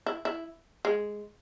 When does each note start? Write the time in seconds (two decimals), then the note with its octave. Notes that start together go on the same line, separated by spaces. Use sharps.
0.06 E4
0.25 E4
0.85 G#3